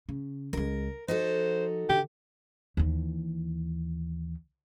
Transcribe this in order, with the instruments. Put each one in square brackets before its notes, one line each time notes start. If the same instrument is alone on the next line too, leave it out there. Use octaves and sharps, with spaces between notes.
[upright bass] C#3
[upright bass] C#2 G#3 [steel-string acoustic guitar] A#4
[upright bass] F3 [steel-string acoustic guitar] D#4 F#4 A4 [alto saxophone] C5
[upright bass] D3 D#3 [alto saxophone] G4
[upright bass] D#2 E3